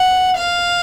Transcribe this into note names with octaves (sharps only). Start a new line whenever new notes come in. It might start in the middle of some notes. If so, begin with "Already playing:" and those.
Already playing: F#5
F5